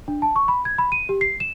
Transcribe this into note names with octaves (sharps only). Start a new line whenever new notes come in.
D4
A5
C#6
B5
G#6
B5
D#7
G4
C7
E7